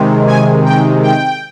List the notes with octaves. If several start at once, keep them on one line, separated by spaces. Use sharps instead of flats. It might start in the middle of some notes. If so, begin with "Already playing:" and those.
Already playing: C3 D#3 G#3
G#5
G5
G5